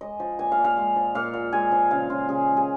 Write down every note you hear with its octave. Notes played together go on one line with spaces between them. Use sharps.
G#3 D#5
F3
A#2 G#5
F5
A#2
F5
G#3
F3
A#2 F5
A#2
G#3 G#5
F3
C#3 F5
C#3 F4
C#3 G#4
G#3
G#4